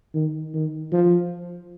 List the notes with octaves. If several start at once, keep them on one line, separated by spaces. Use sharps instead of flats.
D#3
D#3
F3